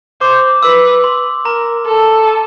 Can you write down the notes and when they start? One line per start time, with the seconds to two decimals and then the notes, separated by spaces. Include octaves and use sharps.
0.21 C5 D6
0.63 B4 E6
1.04 C6
1.45 A#4 A#5
1.86 A4
2.28 A5